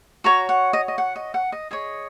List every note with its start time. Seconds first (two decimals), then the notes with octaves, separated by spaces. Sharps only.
0.24 F#4 C#5 A#5
0.49 F#5
0.73 D#5
0.88 D#5
0.98 F#5
1.16 D#5
1.34 F#5
1.52 D#5
1.71 G#4 C#5 D#5